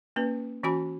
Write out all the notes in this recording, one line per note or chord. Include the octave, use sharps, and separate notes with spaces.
A#3 C#4 B4
E3 C#4 F#4 G#5 B5